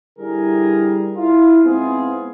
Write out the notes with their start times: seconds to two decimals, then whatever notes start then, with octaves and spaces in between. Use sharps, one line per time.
0.19 D3 G3 E4 G#4 A#4
1.17 E4 F4
1.64 G#2 B3 C4 E4 F4 G#4